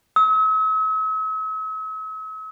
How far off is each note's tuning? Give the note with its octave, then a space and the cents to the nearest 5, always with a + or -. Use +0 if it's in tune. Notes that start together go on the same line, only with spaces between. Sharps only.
E6 -45